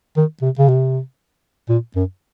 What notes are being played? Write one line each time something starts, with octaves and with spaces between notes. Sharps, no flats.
D#3
C3
C#3
C3
A#2
F#2